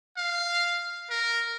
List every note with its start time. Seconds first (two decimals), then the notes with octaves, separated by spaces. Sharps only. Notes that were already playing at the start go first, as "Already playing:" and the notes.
0.17 F5
1.10 A#4